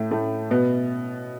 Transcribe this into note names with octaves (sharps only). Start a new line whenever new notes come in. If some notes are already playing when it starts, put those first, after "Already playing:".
Already playing: A2 A3
A2 A3
B2 B3